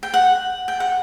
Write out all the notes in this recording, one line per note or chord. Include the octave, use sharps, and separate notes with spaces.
G5
F#5
G5
F#5